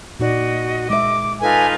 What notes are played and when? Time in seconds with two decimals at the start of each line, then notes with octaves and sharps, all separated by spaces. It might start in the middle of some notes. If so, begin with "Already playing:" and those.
0.20 A#2 D#4 F#4 D5 D#5
0.90 G#3 E5 D6
1.41 D#4 F4 A4 B4 G#5